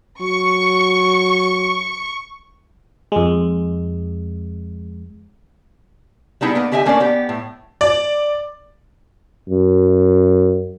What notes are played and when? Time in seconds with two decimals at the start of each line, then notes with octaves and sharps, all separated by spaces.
0.21 F#3 C#6
3.12 F2 G#3
6.41 G3 B3 D#4 E4 G#4
6.55 A#3 B3 D#4
6.72 D3 G4 D#5 E5 F#5 G#5
6.86 A3 A#3 C#4 D4 A#4 D5
7.00 B3 G4
7.29 A2
7.81 D5
9.48 F#2